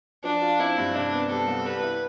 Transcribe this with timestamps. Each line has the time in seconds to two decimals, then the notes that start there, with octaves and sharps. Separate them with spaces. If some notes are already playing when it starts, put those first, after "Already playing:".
0.24 F3 D4
0.42 F4
0.59 C4 E4
0.78 G2
0.95 C3 D4
1.12 B3
1.30 G3 A4
1.48 C2
1.66 G3 B4
1.83 E4